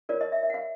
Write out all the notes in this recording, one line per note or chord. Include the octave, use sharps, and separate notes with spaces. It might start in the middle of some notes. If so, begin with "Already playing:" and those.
F4 A#4 C#5 D5
D#5
E5
E5
F#5
F5